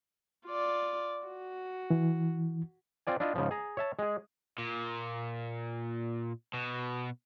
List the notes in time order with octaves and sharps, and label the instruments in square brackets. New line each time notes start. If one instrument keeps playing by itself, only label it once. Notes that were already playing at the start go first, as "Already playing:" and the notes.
[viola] F4 D5
F#4
[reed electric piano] E3
[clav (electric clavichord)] C4 F4 D5 G#5
D4 E4 F4 D#5
G#2 C#3 F3
G#4 A#5
C#5 E5 A5
G#3 G#4
[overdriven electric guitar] A#2
B2